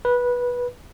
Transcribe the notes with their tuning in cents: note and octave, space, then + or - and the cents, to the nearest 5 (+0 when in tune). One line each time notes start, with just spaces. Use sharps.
B4 -15